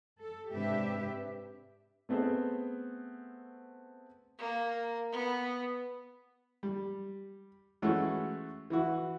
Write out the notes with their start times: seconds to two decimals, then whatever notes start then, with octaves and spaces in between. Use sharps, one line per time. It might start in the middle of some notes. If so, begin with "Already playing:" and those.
0.21 A4
0.53 G#2 C3 D4 G4 B4 E5
2.09 A3 B3 C4 G#4 C5
4.39 A#3
5.12 B3
6.63 G3
7.82 E3 G#3 A3 C#4 E4 F#4
8.70 E3 E4 F#4